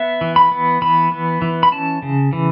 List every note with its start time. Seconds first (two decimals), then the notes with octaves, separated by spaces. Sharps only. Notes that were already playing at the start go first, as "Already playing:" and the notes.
Already playing: B3 E5
0.21 E3
0.36 B5
0.52 B3
0.82 E3 B5
1.12 B3
1.42 E3
1.63 B5
1.72 C#4 A5
2.02 C#3
2.33 E3